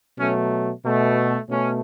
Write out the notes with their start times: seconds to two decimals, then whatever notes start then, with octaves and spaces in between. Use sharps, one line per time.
0.18 B2 F#3 A3 C#4
0.85 B2 A3
1.50 B2 A3 C#4